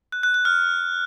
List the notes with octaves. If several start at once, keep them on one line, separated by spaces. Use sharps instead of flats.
F#6
F#6
F#6
F6